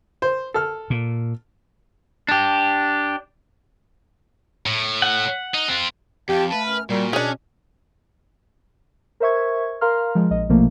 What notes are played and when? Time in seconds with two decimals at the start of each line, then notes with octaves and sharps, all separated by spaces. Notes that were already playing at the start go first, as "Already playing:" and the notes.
0.22 C5
0.54 A4 F6
0.90 A#2
2.29 D4 G4
4.66 A2
5.02 F#5
5.54 D#4
5.69 C4 F4
6.29 F2 G4 F5 A5
6.52 A3 B4
6.67 F#2 F6
6.90 A#2 G3 F#4 A#4
7.13 B2 C#4 D4 G#4
9.20 A#4 C5 E5 C#6 G#6
9.81 A#4 F5 A#5 C6 F6
10.15 F3 G#3
10.31 A#1 D#5
10.49 A#1 B2 F3 A3 A#3